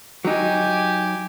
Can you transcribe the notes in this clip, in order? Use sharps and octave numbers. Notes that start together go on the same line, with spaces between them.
F#3 D#4 G4 G#5